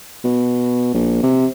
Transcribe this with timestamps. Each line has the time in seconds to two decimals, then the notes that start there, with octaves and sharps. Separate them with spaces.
0.24 B2
0.94 A#1
1.23 C3